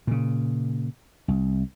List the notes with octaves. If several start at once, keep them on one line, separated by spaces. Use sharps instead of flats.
A#2 C#3
C2